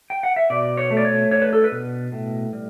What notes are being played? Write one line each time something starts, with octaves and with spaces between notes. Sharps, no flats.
G5
F#5
E5
B2 D5
C#5
A3
D5
C#5
D4 C#5
B4
A4
B4
B2
A2
G3